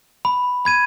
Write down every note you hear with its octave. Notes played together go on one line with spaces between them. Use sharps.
B5
B5 G#6 D#7